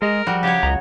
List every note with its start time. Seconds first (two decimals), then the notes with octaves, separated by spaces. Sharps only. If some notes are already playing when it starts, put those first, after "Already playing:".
0.02 G#3 G#4 A#4 D#5
0.27 F3 G3 F#4
0.43 C#3 F#3 G4 C#5
0.63 C#2 D#5 A#5